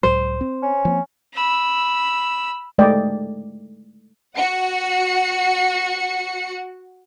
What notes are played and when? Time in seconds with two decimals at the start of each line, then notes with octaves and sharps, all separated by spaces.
0.03 C#2 A2 F#3 C5
0.41 C4
0.62 C#4
0.85 F3 A#3 C4
1.34 B5 E6
2.78 G#3 A3 D5 D#5 G5
4.38 F#4 F#5 C#7